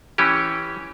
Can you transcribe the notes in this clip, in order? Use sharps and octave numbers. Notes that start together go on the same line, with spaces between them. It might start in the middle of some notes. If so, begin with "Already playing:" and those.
E3 C#4 G4